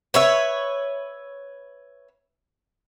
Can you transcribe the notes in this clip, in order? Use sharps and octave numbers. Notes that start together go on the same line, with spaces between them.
B4 C#5 E5